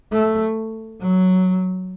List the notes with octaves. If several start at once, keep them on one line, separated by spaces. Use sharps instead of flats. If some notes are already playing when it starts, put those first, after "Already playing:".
A3
F#3